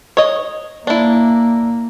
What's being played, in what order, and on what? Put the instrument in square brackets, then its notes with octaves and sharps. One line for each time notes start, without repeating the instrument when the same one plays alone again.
[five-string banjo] C#5 D#5
[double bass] A#3 [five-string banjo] D4 E4